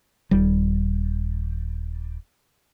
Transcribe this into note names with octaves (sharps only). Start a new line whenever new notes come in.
D#1 G3